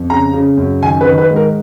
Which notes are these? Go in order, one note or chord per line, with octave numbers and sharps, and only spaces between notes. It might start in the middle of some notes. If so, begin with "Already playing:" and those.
Already playing: F2
C#3 A#5
C#3
F#2
D#3 G#5
B4
D#3
B4
G#2
A#4